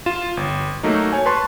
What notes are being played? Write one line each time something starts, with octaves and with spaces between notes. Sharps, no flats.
F4 E7
G1
F#3 A3 A#3 D#4
C#5 G#5
B4 A5 C6 C#6